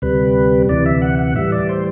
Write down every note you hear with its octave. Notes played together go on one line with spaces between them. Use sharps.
D2 C3 G3 B4
D2 C3 E3 D5
E5
F#5
F#5
A2 E3 G3 E5
D5
C5